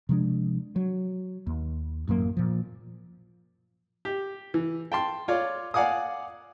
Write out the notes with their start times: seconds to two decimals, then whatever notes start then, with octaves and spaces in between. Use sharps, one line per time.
0.09 C3 F3 G#3 D4
0.76 F#3
1.47 D#2
2.08 A1 F#2 F#3 A#3
2.37 A#2 F3
4.05 G4
4.54 E3
4.92 G5 A5 C6
5.28 F4 C#5 D5
5.74 D5 F5 F#5 G#5 D6 D#6